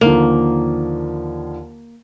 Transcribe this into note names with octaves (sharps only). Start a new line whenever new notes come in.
D#2 D3 F3 A#3